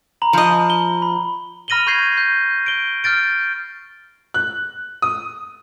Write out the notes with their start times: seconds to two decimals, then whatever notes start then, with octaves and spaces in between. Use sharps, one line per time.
0.22 A#5 B5 F#7
0.33 F3 D#5
0.70 G7
1.02 B5
1.68 B5 F6 A#6 D#7 F#7 G7
1.86 B5 C#6 G6 G#6 C7
2.17 G6
2.66 D7 G7
3.04 F6 G6 A6 D7
4.34 F#6
5.02 D#6